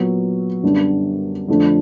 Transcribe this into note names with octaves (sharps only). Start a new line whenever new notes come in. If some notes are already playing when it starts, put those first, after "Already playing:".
Already playing: A#2 F#3 B3
F#2 D3 G3 B3 D4
F2 D3 F3 A3 D4